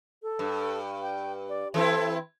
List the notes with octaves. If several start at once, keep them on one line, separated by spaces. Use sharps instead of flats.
A4
G2
G5
D5
E3 C4 E4 A4